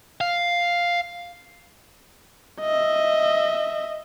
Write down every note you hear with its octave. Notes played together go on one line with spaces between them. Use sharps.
F5
D#5 E5